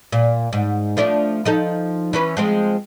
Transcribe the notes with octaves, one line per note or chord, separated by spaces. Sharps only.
A#2
G#2
F3 A3 D4
F3 D#4 A4
E3 C#4 B4
F3 G#3 C4